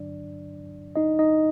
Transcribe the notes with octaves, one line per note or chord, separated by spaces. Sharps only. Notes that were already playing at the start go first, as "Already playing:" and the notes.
Already playing: G2 D3 F#3 D4 D5
D#4 D#5
D#4 D#5